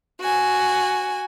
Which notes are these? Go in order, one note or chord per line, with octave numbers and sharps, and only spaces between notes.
F#4 G#5